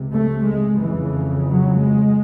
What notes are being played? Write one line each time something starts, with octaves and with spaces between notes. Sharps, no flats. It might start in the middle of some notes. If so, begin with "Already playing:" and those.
Already playing: C#2 C3
A3
G#3
F2 C#3 E3
F#3
G#3